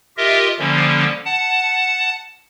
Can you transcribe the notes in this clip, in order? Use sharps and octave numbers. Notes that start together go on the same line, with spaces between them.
F4 G4 A#4 D#5 E5
D3 F3 G3 A#3 C#4
F#5 A5